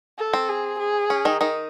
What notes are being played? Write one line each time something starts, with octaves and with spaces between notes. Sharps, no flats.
A4
C4
G#4
G#4
C#4
D#3 D#4
D#3 D#4